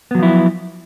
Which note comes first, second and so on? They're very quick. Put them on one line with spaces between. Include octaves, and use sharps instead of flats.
B3 F#3 F3 E4